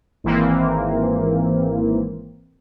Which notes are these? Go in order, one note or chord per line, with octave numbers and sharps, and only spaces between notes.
G#1 E3 A#3 C4